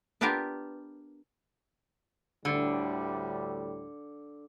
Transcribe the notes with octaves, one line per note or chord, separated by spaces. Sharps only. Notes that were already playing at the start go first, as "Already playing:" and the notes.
B3 D4 F4 G4 A#4 B4
D2 A2 D3 G3